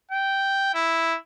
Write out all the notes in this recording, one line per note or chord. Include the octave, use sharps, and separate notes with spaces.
G5
E4